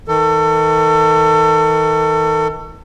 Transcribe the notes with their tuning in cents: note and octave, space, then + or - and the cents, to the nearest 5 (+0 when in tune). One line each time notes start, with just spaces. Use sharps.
D#3 +40 A4 +30